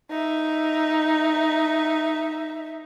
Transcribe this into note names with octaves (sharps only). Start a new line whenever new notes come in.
D#4 E5